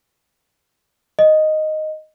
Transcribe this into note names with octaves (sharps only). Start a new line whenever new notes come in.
D#5